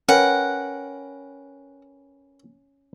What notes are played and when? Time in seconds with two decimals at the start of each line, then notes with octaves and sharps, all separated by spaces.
0.09 C#4 A#4 B4 F#5 G5